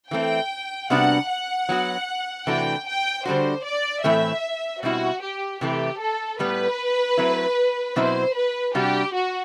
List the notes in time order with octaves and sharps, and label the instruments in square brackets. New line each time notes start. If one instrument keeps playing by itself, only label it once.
[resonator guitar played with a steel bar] E3 A3 C4 [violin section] G5
[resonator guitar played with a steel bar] C3 G3 B3 D4 F#4 [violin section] F#5
[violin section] F#5
[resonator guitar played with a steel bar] F#3 B3 F#4
[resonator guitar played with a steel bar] C3 E3 A3 D4 F#4 [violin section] G5
[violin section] G5
[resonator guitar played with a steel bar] D3 G3 D4 F#4 [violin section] C5
[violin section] D5
[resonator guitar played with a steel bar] A2 E3 A3 C4 [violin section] E5
[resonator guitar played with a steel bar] B2 G3 C4 E4 [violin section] F#4
[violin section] G4
[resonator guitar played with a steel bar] C3 E3 A3 E4 [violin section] G4
[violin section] A4
[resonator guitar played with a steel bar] A2 G3 B3 [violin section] B4
[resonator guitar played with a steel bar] F#3 A3 C4 E4
[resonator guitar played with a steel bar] B2 F#3 C4 E4 [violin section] C5
[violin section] B4
[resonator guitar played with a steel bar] C3 G3 D4 F#4 [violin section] G4
[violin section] F#4